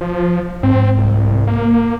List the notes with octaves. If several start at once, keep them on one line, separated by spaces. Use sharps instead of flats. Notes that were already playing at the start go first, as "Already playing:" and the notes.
F3
G#2 C4
C2
A#3